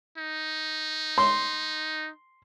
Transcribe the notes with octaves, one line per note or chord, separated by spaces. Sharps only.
D#4
C6